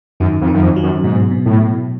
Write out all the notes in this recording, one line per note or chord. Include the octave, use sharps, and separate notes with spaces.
F#2 D#3
F2
D#3
F#2
F2
F#3
F#2
G#2 B2
B2
A2
B2